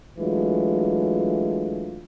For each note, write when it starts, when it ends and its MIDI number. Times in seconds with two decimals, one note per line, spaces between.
0.19 2.04 52
0.19 2.04 54
0.19 2.04 56
0.19 2.04 57
0.19 2.04 62
0.19 2.04 65